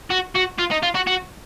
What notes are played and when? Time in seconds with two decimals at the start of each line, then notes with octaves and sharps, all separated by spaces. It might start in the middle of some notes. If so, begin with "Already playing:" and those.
0.11 F#4
0.36 F#4
0.59 F4
0.71 D#4
0.83 F4
0.95 F#4
1.07 F#4